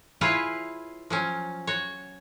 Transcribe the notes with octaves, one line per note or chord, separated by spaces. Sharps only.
E4 F4 G#4 B4 C#5 F5
F3 F#3 C#4
F#4 C#5